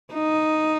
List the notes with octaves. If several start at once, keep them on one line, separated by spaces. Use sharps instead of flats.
D#4